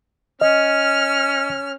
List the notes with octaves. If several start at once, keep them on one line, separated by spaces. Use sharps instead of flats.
C#4 D#5 F6